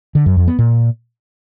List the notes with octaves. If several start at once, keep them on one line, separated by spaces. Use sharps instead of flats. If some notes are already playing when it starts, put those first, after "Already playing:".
D3
F#2
F2
B3
A#2